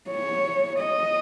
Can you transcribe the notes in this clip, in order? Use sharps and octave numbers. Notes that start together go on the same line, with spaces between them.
C#5
D#5